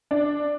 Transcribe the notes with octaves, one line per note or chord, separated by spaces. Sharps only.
D4